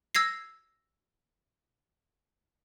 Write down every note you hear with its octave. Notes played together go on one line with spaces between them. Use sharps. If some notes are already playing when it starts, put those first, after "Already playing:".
E6 G#6 A#6 C7